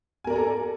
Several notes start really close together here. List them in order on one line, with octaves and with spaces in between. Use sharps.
G#5 A#4 D5 A#5 A4